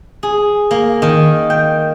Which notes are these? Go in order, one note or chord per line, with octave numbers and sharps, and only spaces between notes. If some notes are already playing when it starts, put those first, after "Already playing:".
G#4
A#3
D#3
G5